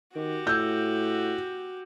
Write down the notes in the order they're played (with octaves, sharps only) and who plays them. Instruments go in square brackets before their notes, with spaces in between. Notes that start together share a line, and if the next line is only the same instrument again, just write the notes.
[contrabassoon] D#3 [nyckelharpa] F#4 G4
[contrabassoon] A2 [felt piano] E6 G6